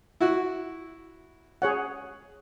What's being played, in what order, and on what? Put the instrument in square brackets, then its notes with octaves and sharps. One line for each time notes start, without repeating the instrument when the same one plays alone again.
[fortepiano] E4 F#4
[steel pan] G#4 C#5 F#5